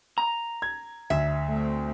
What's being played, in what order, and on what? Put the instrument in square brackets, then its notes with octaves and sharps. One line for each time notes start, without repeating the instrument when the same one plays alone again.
[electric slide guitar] A#5
[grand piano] G#6
[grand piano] D2 [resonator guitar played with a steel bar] E5
[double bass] A3 C4